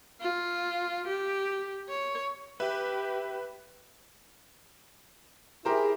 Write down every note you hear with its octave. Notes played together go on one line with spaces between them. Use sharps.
F4
G4
C#5
G4 B4 E5
E4 G4 G#4 A#4 C5